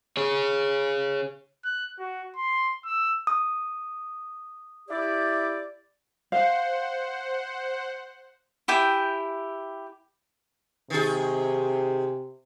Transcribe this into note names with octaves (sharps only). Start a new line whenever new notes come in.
G#4 C#5
F#6
F#4
C6
E6
D#6
E4 G4 D5
C5 F5 F#5
E4 G4 G5 G#5
C3 D#3 G#4